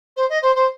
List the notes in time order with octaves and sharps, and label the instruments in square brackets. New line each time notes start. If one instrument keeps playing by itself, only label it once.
[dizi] C5
D#5
C5
C5